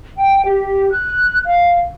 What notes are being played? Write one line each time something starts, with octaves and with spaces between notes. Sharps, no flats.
G5
G4
F#6
F5